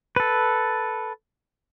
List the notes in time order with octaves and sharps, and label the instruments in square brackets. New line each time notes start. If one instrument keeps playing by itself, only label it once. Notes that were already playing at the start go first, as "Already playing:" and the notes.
[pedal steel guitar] A4 B4